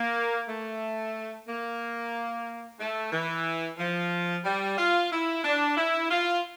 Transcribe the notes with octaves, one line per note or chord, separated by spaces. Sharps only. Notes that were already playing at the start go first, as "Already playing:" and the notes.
Already playing: A#3
A3
A#3
A3
E3
F3
G3
F4
E4
D4
E4
F4